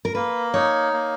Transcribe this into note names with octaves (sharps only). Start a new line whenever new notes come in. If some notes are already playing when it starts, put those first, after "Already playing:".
A#4
A#3 B4
D#4 C#5
A#3